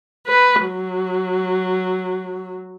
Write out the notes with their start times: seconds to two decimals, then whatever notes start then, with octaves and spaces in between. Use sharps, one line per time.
0.27 B4
0.65 F#3